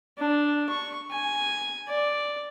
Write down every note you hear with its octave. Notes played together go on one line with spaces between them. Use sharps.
D4
C#6
G#5
D5